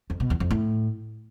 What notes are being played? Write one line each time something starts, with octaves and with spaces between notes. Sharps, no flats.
F2
B2
E2
F2
A2